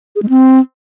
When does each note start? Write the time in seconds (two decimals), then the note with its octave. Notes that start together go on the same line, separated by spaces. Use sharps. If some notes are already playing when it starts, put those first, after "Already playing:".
0.16 G#4
0.23 G#3
0.29 C4